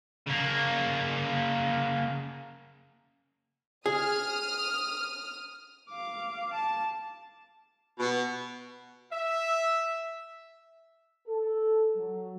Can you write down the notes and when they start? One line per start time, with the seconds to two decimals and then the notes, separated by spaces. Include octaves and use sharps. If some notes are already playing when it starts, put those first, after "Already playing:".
0.27 C#3 A#3
3.86 G#4 D#6 F6
5.90 F5 D6
6.53 A5
7.99 B2
9.12 E5
11.27 A4
11.96 F#3